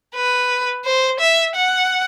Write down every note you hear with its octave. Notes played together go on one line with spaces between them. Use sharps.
B4
C5
E5
F#5